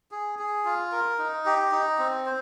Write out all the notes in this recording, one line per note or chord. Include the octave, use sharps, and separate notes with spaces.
G#4
G#4
F4
A#4
D#4
G4
D#4
C4
C5